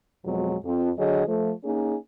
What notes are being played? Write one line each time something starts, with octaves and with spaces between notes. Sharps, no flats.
F2 B2 F#3 G#3
F2
D3 F#3 G#4 D#5
F3 A3
A#3 C#4 D#4 G#4